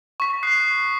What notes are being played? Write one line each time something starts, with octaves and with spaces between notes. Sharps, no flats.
C#6 B6
D#6 F#6 C7